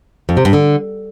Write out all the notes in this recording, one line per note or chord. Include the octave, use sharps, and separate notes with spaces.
F2
C3
G2
D3